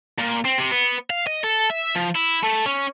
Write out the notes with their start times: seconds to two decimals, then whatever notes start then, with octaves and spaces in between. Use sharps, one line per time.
0.19 A#2
0.45 C4
0.58 C3
0.72 B3
1.10 F5
1.27 D#5
1.44 A4
1.70 E5
1.95 F3
2.16 E4
2.44 A3
2.66 C#4